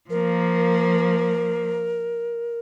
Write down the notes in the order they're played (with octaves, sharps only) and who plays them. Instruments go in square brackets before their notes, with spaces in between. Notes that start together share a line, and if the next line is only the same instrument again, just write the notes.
[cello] F3 A#3 [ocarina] A#4